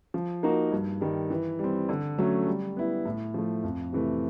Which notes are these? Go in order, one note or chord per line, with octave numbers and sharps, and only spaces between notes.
F3
A#3 D#4 F#4 A#4
G2
D#3 G3
E3
G3 C4
D3
F#3 A3 C#4
G3
B3 E4
A2
F3 A3
F2
C3 E3 A3